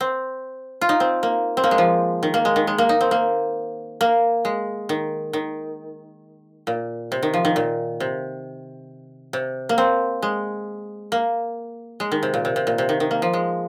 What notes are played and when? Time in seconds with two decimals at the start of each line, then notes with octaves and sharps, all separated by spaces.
0.01 C4
0.81 F4
0.89 D#4
1.00 C4
1.23 A#3
1.57 C4
1.64 A#3
1.71 G#3
1.78 F3
2.23 D#3
2.34 A#3
2.45 G#3
2.56 D#3
2.67 G#3
2.78 A#3
2.89 D#4
3.01 C4
3.11 A#3
4.01 A#3
4.45 G#3
4.89 D#3
5.33 D#3
6.67 A#2
7.12 C3
7.23 D#3
7.34 F3
7.45 D#3
7.56 A#2
8.00 C3
9.33 C3
9.69 A#3
9.78 C4
10.22 G#3
11.12 A#3
12.00 G#3
12.12 D#3
12.23 C3
12.34 A#2
12.45 C3
12.56 C3
12.67 A#2
12.78 C3
12.89 D#3
13.00 D#3
13.11 A#3
13.22 F3
13.33 G#3